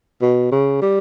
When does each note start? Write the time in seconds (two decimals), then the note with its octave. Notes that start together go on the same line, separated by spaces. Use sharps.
0.21 B2
0.52 C#3
0.82 G3